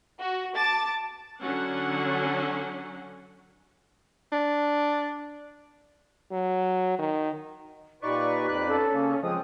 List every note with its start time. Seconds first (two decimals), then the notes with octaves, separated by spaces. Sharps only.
0.20 F#4
0.56 A5 D6 A6
1.41 D3 F#3 C#4 F#5
4.32 D4
6.32 F#3
6.99 D#3
8.03 A#2 D#4 G4 B4 D5 C#6
8.48 F2 D5 F#6
8.67 C#4 A4
8.93 C#3 A#3
9.23 C#3 F3 G#3 C4 D#6